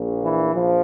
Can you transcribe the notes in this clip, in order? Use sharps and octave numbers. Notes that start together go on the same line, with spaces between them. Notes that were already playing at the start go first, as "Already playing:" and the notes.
Already playing: A#1 A#2
E3
A#1 F3